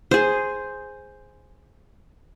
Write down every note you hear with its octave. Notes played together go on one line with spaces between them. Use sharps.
G#4 C5